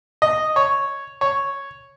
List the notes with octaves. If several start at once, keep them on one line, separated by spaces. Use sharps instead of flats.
D#5
C#5
C#5